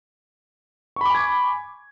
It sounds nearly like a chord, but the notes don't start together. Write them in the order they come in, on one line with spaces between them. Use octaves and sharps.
C#6 B5 D6 G#5 G#6